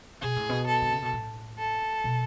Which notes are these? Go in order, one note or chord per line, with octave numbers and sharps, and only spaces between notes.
B2 G#4
A2
B2
A4
D3
C#3
B2
A2
A4
B2